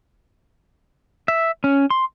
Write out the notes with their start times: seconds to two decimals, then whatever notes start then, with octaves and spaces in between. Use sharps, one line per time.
1.28 E5
1.64 C#4
1.90 C6